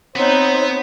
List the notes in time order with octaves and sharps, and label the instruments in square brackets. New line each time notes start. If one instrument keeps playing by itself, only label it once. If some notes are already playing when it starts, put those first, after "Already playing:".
[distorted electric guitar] B3 [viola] C4 D#4 [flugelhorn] C5 [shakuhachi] C#5